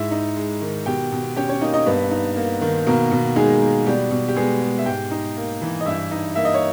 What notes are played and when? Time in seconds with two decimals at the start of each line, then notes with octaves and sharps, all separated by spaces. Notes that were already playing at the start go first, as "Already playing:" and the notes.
Already playing: G#2 E4 E5
0.11 D#4
0.37 G#3
0.61 D#3
0.86 B2 G4 G5
1.12 B2
1.36 C#4 G4 G5
1.49 C#4 C#5
1.61 A#3 D#4 D#5
1.73 D#4 D#5
1.86 G2 B3 B4
2.11 D#4
2.36 A#3
2.61 D#3
2.87 B2 A#3 A#4
3.12 B2
3.36 G#3 D#4 G#4
3.61 A#3
3.86 B2 G3 G4
4.11 B2
4.28 G4
4.36 G#3 B3 G#4
4.61 G#3
4.78 E5
4.86 G#2 G4 G5
5.11 D#4
5.36 A#3
5.62 E3
5.81 D#5
5.86 G2 E4 E5
6.11 D#4
6.36 A#3 E5
6.45 D#5
6.54 C#5